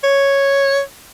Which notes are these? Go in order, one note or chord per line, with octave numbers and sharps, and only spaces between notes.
C#5